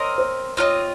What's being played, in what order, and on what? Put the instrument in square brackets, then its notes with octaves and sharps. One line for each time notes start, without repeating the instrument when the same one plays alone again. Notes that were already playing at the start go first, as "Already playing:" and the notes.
Already playing: [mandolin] C4 A#4 D#5 [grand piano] C#5
[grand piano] C5
[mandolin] C4 F4 A#4 D#5 [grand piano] C#5